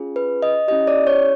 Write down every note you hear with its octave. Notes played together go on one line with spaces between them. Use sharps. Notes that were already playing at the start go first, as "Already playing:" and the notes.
Already playing: C#4 F4 G#4
B4
D#5
C#4 E4 G4 D#5
D5
C#5